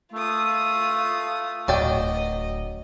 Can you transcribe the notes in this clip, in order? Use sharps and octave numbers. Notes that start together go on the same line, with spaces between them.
A3 F4 D#6
D1 F#3 D5 D#5 G5